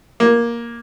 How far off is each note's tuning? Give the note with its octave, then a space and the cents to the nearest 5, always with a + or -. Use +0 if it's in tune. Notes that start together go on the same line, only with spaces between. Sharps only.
A#3 +10